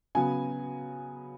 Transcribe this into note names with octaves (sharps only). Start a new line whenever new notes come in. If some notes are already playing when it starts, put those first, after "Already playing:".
C#3 F#3 B3 G#5